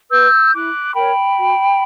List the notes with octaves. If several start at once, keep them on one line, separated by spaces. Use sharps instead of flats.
B4 E6 G6
E4 D6 F#6
A#4 C#5 G5 B5
F#4